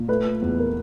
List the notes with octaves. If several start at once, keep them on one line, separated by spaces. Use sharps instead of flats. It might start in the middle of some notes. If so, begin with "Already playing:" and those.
Already playing: A#2
A3 B4
E2
A#4